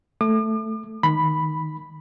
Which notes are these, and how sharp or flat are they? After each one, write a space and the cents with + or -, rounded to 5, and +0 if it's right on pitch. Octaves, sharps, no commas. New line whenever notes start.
A3 +0 D6 +45
D#3 +0 B5 +0